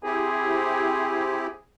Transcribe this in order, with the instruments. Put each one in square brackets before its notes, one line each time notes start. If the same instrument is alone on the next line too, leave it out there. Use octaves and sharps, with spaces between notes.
[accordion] C4 E4 G4 [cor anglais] G#4